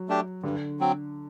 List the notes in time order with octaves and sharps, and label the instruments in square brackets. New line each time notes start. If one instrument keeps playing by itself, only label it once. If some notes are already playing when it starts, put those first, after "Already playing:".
Already playing: [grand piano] F#3
[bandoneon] A3 D4 G4
[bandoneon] G2 [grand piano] D3
[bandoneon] F#3 C4